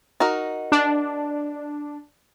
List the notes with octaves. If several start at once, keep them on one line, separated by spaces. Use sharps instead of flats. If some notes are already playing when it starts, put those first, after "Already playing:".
D#4 F#4 A#4
D4